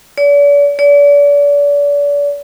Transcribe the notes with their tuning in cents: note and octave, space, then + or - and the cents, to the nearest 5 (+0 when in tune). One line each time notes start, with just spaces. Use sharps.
D5 -45
D5 -40